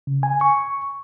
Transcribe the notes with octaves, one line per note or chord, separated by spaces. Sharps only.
C#3
G#5
C#6